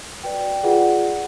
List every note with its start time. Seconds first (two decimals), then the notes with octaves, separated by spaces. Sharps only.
0.23 F#4 B4 D5 G5
0.63 F4 G#4 B4 D5 F#5